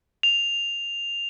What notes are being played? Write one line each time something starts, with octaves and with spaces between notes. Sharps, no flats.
F7